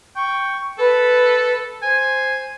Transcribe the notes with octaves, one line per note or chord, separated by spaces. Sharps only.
G5 C#6
A4 B4
C5 G#5